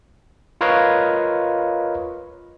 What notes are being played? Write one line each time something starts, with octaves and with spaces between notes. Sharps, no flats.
F4 A#4 B4 C#5 D#5 F5